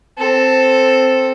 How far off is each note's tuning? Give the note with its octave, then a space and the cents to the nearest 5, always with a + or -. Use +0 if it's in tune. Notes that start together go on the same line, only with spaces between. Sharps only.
C4 +0 A4 +0